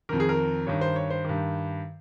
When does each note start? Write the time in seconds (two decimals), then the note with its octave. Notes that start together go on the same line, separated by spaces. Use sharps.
0.09 F2 D#3 A#4
0.20 G#4
0.29 A#4
0.67 G2 D#3 C#5
0.81 C5
0.96 C#5
1.10 C5
1.25 G2 D#3